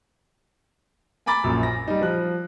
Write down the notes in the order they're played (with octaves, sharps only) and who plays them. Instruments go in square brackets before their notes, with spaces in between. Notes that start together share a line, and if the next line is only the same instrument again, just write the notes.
[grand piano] G#5 A#5 B5 D6 A6
A#1 F#2
A#6
G3 D#4
F3 F#6